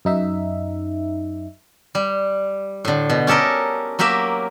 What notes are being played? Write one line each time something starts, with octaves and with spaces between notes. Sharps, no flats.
F#2 D#4 E5
G3
A2 D3
B2
C#4 G4 A4 A#4 D#5
F#3 A#3 G4 A#4 E5